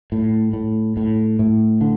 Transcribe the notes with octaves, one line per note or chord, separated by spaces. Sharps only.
A2
A2
A2
A2
D3